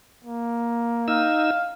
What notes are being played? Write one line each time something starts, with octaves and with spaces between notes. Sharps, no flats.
A#3
D#4 F5 E6